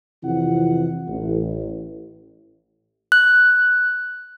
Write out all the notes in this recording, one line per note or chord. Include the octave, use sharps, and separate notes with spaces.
F2 C3 E3 E4 F4 F#5
A1
F#6